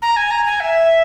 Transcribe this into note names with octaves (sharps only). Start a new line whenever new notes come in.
A#5
G#5
A#5
G#5
E5